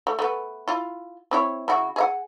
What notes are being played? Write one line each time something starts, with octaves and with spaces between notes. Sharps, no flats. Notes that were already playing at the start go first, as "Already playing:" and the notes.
A3
A3 B3
E4 F4
C4 E4 C#5
C#3 E4 F#4
G#4 E5 F#5